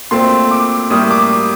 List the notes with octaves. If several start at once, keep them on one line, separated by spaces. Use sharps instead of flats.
A#2 A3 C4 C6
D6
A2 G3 A#3 D#6
D6